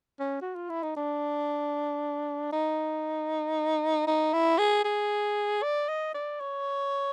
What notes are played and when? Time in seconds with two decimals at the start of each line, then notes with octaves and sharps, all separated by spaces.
0.19 C#4
0.42 F#4
0.55 F4
0.69 E4
0.83 D#4
0.97 D4
2.52 D#4
4.07 D#4
4.33 E4
4.58 G#4
4.84 G#4
5.62 D5
5.88 D#5
6.14 D5
6.40 C#5